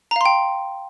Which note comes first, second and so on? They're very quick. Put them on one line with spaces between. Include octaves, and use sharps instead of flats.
A#5 F5 C6 G5